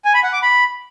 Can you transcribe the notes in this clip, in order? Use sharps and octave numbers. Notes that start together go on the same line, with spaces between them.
G#5
B5
F#5
D6
B5